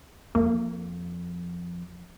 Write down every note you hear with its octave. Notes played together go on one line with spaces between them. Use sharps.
F2 A#3